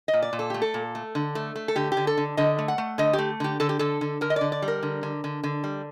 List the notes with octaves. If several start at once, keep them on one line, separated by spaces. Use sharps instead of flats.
D#5
A#2
D5
A#2
A4
A3 G4
A4
A#2
A3
D3
A3
A3
A4
D3 G4
G4
D3
A4
D3
D3 D#5
A3
F#5
A3
D3 D#5
G4
A3
D3 G4
D3 A4
G4
D3 A4
D3
D3 A#4
D#5
D3 D5
D5
G3
A#4
D3
D3
D3
D3
G3